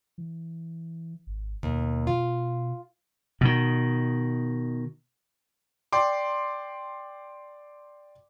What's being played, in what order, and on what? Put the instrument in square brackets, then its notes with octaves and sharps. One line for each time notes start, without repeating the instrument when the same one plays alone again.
[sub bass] E3
G#1
[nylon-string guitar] D#2 [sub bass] B2
[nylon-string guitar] F4
[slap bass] B2 D#3
[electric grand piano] D5 G5 C6 D6